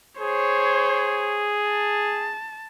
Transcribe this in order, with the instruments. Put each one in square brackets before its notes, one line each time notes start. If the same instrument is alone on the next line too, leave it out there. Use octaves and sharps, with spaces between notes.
[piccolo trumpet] G#4 [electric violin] C5 C#5
[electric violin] A5